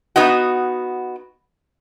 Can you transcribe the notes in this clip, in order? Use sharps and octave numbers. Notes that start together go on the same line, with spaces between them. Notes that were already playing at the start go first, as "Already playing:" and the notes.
B3 D#4 F#4